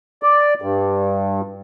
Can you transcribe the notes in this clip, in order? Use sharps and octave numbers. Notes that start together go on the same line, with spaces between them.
D5
G2